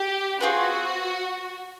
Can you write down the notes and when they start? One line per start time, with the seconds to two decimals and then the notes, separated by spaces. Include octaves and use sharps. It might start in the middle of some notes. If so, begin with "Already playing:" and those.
Already playing: G4
0.41 C4 F4 F#4 G#4 B4